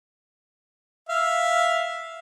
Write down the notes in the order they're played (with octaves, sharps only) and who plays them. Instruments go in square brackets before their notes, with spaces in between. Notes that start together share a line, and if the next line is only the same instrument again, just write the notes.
[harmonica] E5 F5